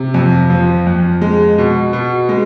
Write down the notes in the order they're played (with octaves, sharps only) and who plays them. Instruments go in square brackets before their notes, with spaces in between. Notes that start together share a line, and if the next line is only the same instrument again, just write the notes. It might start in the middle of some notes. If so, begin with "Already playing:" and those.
Already playing: [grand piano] C3
F2
F3
F2
G#3
B2
B2
G#3